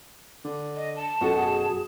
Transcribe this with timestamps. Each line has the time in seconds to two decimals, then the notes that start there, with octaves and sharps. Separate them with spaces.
0.44 D3
0.75 D#5
0.96 A5
1.21 F#2 B2 F#4 A4 F#5
1.37 G#4 A5